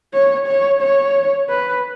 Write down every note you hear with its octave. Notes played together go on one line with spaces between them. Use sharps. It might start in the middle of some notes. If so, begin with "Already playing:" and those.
C#5
C#5
C#5
B4